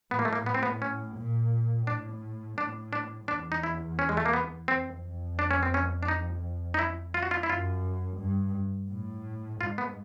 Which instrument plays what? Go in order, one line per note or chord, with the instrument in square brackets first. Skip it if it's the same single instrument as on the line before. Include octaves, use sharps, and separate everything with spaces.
[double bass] A2 [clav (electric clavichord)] B3
[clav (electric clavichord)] A#3
A3
A#3
[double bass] A2 [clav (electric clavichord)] B3
[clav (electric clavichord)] C4
B3
C#4
[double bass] A#2
[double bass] A2 [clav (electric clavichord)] D4
[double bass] A2 [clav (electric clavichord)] D4
[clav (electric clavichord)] D4
[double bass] E2 [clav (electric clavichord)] D4
[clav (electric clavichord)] D#4
E4
C#4
G#3
A3
A#3
B3
[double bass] F2 [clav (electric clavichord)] C4
[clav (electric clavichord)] D4
C#4
C4
C#4
D4
D#4
D#4
E4
F4
F#4
F4
E4
[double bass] F#2 [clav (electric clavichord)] F4
[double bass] G2
A2
[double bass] G#2 [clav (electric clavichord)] F4
[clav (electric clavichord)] B3